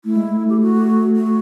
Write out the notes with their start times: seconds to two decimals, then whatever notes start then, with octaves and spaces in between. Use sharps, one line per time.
0.05 A3 E4
0.16 G#3
0.29 A3
0.49 G4
0.61 F#4
1.16 F#4